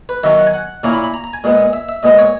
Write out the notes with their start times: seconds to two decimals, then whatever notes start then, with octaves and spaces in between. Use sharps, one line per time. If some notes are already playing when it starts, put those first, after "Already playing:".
0.09 B4
0.24 D#3 F#3 C#4 E5
0.39 F#5
0.47 G#5
0.54 F#5
0.83 A#2 A#3 C#4 E4 A#5
0.93 B5
1.04 B5
1.14 A#5
1.24 A#5
1.33 G#5
1.44 A#2 G#3 B3
1.73 E5
1.89 E5
2.03 A#2 G#3 B3 D#5
2.18 C#5